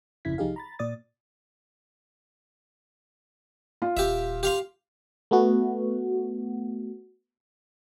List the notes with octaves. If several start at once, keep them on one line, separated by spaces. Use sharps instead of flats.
G1 F2 C#3 E4 G#6 B6
C2 F3 D#4 G4 G#4 F5
A#5 B5 A6
A#2 D5 D#6 A6
F4
D#1 G4 E5
G4 F5 C6
A3 B3 F#4